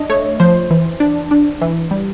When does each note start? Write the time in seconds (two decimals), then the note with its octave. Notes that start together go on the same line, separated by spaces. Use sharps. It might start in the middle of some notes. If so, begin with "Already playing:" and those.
Already playing: D4 D#5
0.09 A3 C#5
0.40 F3 C5
0.70 E3
1.00 D4
1.31 D4
1.61 E3
1.91 G3